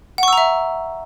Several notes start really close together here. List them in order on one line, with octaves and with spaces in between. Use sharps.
F#5 C#6 E6 A#5 E5